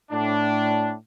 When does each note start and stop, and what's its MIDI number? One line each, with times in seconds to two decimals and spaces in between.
0.12 0.93 45
0.12 0.93 62